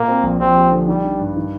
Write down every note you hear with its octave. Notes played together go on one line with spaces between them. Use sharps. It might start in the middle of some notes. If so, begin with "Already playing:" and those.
Already playing: A#2 A#3
C4
A#1
F3 C4
G4
D3
D#3 G3
D4
G2
D#3